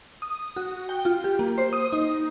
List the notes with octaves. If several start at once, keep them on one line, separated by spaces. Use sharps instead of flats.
D#6
F#4
G5
F4
G4
A#3
C5
D#6
D#4